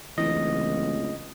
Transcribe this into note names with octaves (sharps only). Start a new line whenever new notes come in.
D1 C#2 E3 D#5